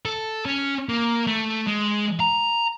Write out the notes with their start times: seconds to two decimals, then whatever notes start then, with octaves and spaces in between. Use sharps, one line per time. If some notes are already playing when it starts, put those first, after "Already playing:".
0.05 A4
0.46 C#4
0.89 A#3
1.27 A3
1.67 G#3
2.20 A#5